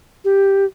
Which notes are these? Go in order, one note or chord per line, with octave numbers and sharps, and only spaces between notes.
G4